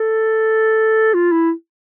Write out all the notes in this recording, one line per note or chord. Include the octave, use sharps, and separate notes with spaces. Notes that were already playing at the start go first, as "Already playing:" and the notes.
Already playing: A4
F4
E4